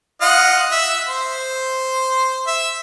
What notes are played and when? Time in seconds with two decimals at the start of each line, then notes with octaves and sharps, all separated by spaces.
0.21 F4 D#5 F#5
0.72 E5
1.08 C5
2.47 E5